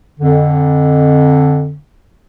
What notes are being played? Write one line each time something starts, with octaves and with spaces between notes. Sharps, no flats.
F2 D3